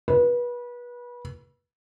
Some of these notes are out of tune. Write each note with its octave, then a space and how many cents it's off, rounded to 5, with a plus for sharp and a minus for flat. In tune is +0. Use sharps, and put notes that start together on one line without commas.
B4 -30